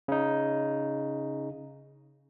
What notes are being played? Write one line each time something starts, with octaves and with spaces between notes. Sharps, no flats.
C#3 D#4